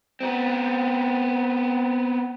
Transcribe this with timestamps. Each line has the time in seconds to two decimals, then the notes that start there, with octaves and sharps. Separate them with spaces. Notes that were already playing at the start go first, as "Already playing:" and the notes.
0.21 B3 C4